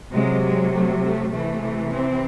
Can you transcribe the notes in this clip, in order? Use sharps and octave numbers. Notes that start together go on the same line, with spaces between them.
C3 F#3 G#3
G#3
A3
A3
C3 E3 A3
C4